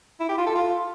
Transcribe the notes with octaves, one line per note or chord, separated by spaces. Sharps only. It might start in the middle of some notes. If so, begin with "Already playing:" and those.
E4
G4
F4
A4
F4